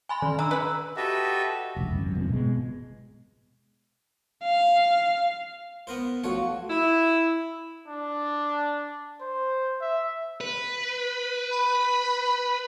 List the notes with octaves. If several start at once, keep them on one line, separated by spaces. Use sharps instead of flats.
G#5 B5 C6
D#3
D4 A#5 E6
B4 B5
F#4 G4 A4 B4 D#5 E5
F1 C#2
G#1 F#2
D#1 G#1 A#2 C4
B2 G#3
F5
B3 A#4 C5
F3 A3 F#4 C#5 F5
E4
D4
C5
E5
B4
B5